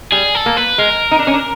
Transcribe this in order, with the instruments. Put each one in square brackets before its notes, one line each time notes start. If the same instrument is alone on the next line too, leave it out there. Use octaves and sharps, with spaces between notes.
[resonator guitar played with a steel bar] G3 [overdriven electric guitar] G#4
[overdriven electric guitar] A4
[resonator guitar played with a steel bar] A#3
[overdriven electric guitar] B4
[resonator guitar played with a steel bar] G#3 [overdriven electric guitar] A#4
[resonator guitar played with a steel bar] D#4
D4
C#4
D4